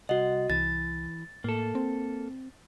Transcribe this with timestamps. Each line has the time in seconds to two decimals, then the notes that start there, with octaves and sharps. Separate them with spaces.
0.09 C2 F#4 D#5 F#5
0.50 C2 E3 A6
1.44 A2 A#3 A4
1.75 C4